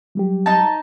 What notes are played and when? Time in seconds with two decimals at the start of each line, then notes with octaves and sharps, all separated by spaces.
0.15 F#3 G3 G4
0.46 D#4 A5